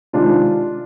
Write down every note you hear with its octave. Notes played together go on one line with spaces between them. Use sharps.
C3 D#3 G#3 D4 F4